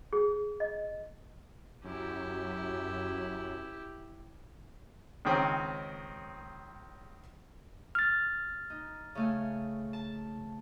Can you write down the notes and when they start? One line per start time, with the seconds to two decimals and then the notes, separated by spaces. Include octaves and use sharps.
0.13 G#4
0.60 D#5
1.84 F#2 E4 G4
5.25 C#2 D#3 C4 C#4
7.95 F6 A6
8.70 D#4
9.15 C#3 A3 G#5
9.93 A5